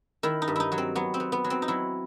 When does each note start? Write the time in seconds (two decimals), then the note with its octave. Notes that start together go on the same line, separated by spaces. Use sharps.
0.23 D#3 E4
0.42 D#4
0.48 G2
0.56 D#4 E4
0.72 F#3
0.78 C4
0.95 F#3 B3
1.14 C4
1.20 B3
1.32 B3
1.44 F#3
1.50 C4
1.62 D#4
1.68 F#3 E4